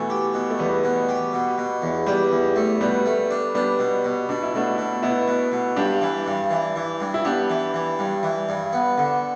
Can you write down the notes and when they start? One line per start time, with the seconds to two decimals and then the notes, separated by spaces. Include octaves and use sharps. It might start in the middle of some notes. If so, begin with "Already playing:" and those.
Already playing: B2 E3 A3
0.10 G4
0.34 B2
0.50 A3
0.59 E2 G3 B3
0.84 B2
1.09 G4
1.33 B2
1.58 B2
1.82 E2
2.07 G3 B3 G4
2.32 E2
2.56 A3
2.81 B2 G3 B3
3.06 A3
3.31 D4
3.55 G3 B3 D4
3.79 B2
4.04 B2
4.29 B2 D4
4.43 E4
4.54 B2 A3 D4
4.78 B2
5.02 B2 B3 E4
5.28 B2
5.52 B2
5.76 G2 D4 G4
6.02 E3
6.27 G2
6.51 E3
6.76 E3
7.01 G2
7.14 E4
7.25 B3 D4 G4
7.50 E3
7.74 E3
7.99 G2
8.23 E3
8.49 G2
8.73 B3
8.98 D3